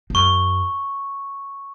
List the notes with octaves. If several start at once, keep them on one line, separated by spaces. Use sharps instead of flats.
G2
F#2 C#6